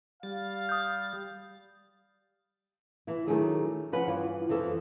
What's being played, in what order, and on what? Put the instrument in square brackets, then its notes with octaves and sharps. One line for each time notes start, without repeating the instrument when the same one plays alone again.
[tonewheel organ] G3 A6 [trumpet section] F5
[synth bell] D#6 G6
[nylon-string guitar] E3 E4
D#3 E3 F#3 A3 D4 G#4
C#3 F3 C#4 B4 F#5
G2 E3 F4
F2 E3 F3 A4